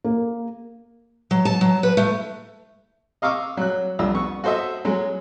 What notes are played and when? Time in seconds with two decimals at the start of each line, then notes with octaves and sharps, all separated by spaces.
0.04 A#3
1.31 F#3
1.45 A5
1.61 F#3
1.83 B4
1.97 A3
3.22 D#5 F5 C#6 D6 E6
3.57 F#3 F#6
3.99 C2 F2 D4 E6
4.14 B3 C#6
4.44 F#4 A4 C5 D#5 E5
4.85 F#3 G#3